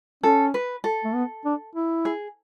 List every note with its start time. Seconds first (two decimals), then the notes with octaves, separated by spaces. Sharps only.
0.23 C#4 A4
0.54 B4
0.84 A4
1.04 A3
1.15 B3
1.45 D4
1.75 E4
2.05 G#4